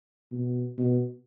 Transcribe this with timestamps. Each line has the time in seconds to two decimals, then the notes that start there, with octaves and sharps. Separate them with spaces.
0.32 B2
0.78 B2